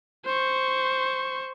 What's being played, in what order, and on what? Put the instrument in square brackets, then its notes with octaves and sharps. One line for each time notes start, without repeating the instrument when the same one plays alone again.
[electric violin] C5 C#6